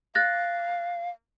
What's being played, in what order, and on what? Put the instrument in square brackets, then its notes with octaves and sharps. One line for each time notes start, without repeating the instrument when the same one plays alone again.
[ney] F5 [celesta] F#6 A6 A#6